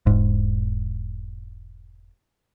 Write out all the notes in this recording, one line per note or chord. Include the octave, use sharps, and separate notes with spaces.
E1 G#2